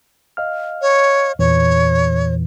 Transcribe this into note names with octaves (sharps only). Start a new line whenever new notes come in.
D#5 F5 F6
C#5
E2 A#2 E3 C#5